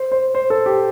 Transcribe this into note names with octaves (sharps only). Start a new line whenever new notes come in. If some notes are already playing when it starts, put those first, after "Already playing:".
Already playing: C5
C5
C5
A4
G4